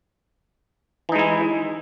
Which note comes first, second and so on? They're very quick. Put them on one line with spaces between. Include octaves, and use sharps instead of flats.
E3 D#4 G#3 E4